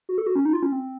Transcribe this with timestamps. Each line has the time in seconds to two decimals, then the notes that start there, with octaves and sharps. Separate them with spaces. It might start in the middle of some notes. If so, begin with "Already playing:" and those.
0.09 F#4
0.18 A4
0.27 F#4
0.35 C#4
0.45 D#4
0.53 F4
0.63 C#4
0.72 C4